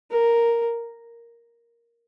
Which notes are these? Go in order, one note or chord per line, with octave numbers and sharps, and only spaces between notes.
A#4